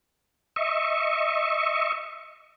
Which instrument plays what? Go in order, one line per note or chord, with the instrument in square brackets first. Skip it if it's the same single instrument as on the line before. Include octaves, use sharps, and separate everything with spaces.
[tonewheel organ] D#5 E5 C#6